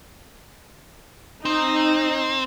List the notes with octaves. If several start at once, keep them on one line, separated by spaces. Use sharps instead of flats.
C4 D#4